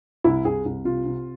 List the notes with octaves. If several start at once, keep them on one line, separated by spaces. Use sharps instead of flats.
C2 E4
C2 G#4
C2
C3 F4
C3